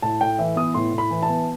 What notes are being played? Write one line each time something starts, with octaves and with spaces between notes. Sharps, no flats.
A2 A5
A2 G5
E3 E5
B3 D#6
A2 C6
A2
B5
E3
A5
B3